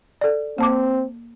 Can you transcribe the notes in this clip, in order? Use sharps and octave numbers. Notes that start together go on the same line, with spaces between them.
A4 D5
A#3 C4 A5 D6